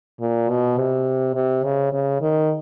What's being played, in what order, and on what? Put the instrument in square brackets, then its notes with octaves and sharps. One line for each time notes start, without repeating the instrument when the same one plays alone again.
[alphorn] A#2
B2
C3
C3
C#3
C#3
D#3